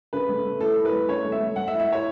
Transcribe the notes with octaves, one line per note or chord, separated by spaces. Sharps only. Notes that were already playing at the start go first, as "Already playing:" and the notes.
C#3 B4
A3
A3
E4 A4
E4
B4
A3
C#3 C#5
A3
E5
A3
A3 F#5
E5
E4
E5
E4 C#5